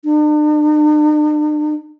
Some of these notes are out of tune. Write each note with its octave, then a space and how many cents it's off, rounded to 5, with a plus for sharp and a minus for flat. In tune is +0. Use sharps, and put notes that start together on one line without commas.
D4 +45